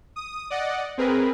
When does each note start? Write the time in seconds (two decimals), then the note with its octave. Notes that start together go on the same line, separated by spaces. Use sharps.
0.16 D#6
0.50 D5 D#5 F#5
0.98 C4 G#4 A#4 B4